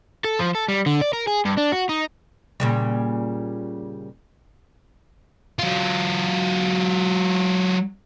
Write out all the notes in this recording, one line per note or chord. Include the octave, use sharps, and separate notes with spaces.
A4
F3
A4
G3
D3
D5
A#4
G#4
G2
D4
F#4
D#4
A#2 C#3 G3
F#3 F4